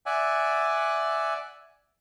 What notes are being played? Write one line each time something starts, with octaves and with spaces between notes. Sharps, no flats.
D5 E5 F#5 G#5